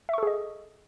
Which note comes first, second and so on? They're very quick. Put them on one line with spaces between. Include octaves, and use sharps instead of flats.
E5 C#6 A4 G#4 D#5